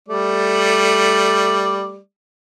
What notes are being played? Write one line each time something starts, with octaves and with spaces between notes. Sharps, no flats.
G3 A3 D5